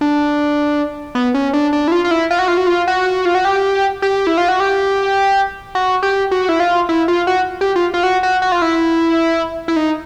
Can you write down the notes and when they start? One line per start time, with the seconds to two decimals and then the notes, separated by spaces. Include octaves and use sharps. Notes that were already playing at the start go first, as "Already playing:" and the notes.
0.01 D4
1.15 B3
1.34 C#4
1.53 D4
1.73 D4
1.88 E4
1.92 F4
2.05 F4
2.11 E4
2.31 F4
2.39 F#4
2.48 F4
2.57 F#4
2.67 F4
2.88 F#4
3.25 F4
3.35 F#4
3.45 G4
4.02 G4
4.27 E4
4.38 F4
4.49 F#4
4.60 G4
5.75 F#4
6.03 G4
6.31 F#4
6.49 E4
6.60 F4
6.89 E4
7.08 F4
7.27 F#4
7.61 G4
7.76 F4
7.94 F4
8.03 F#4
8.23 F#4
8.42 F#4
8.52 F4
8.62 E4
9.68 E4
9.76 D#4